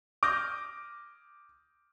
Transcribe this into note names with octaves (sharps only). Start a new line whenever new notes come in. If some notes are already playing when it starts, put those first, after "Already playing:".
D6 D#6 F6 G6 A#6